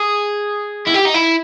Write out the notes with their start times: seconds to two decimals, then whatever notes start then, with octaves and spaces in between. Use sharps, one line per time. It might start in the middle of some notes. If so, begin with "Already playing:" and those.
Already playing: G#4
0.87 E4
0.94 G4
1.05 D#4
1.14 E4